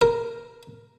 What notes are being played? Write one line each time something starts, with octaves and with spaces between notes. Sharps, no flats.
A#4